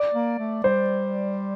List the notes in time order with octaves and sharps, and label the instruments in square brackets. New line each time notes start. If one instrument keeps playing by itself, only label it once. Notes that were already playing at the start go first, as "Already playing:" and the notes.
Already playing: [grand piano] D5
[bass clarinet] A#3
A3
[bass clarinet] G3 [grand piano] C5